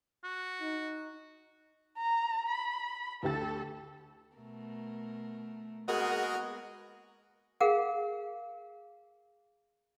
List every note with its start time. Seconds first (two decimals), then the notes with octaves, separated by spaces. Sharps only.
0.24 F#4
0.60 D#4
1.97 A#5
2.48 B5
3.23 D2 G4 A4 A6
4.36 B2 A3 A#4
5.88 G#3 A#3 B3 F#4 G#4 A#4 D#5
7.61 G#4 A#4 F5 F#5